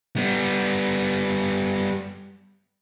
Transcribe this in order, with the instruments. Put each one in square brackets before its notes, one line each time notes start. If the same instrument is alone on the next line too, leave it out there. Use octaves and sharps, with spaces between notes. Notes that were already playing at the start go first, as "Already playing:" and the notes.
[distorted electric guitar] G3 B3